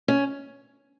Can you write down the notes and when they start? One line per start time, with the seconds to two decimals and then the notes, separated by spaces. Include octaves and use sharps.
0.08 C#4